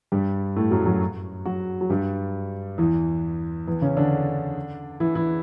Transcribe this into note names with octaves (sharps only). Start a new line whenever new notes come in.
G2 G3
A2 A3
F#2 F#3
F#2 F#3
F#3 F#4
F#3
G2 G3
E2 E3
E2 E3
C#3 C#4
D3 D4
E3 E4
E3 E4